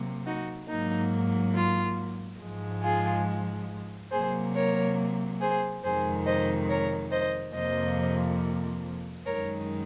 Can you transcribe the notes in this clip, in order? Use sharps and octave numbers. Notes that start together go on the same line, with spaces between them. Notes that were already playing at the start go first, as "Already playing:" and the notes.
Already playing: C3 F#3 A#3
D#4 F#4
G#2 F#3 A#3 D#4
F4
G#2 F3 G#3
F4 G#4
C3 F#3 A#3 G#4 C5
A#4 C#5
G#4 C5
F2 C3 D#3 G#3 G#4 C5
C5 D#5
A#4 C#5
C5 D#5
F2 C3 F3 A#3 C5 D#5
F#2 D#3 G#3 A#4 C#5